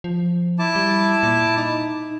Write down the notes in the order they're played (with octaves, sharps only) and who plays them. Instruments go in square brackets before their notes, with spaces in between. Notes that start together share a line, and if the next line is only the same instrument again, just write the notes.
[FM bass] F3
[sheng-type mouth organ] E4 A5 D6
[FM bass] G3
A#2
D#4